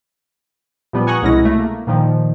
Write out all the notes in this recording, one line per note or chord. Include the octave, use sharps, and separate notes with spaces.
A#2 F3 G3 B3
F#5 G#5 A#5 C#6 D#6 F#6
C2 B2 G#3 C#4 E4 A#6
A3
A#3
A#2 D#3 F3